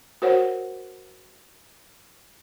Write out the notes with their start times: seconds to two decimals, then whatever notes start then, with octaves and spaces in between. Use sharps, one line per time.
0.22 F#4 A#4 C5 C#5 F#5